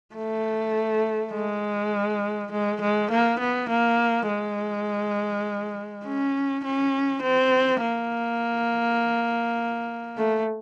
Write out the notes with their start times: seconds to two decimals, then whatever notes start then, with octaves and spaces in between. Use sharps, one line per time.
0.15 A3
1.33 G#3
2.52 G#3
2.81 G#3
3.11 A#3
3.39 B3
3.69 A#3
4.28 G#3
6.05 C#4
6.64 C#4
7.22 C4
7.81 A#3
10.17 A3